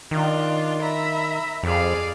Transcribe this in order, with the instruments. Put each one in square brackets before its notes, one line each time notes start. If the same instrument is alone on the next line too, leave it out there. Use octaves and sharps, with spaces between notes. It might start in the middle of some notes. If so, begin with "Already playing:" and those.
[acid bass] D#3 [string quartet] D4 F4
[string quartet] E5 A#5 B5
[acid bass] F2 [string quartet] G#4 D5 F5